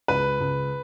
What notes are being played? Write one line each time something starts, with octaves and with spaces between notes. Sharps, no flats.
C#2 B4
C#2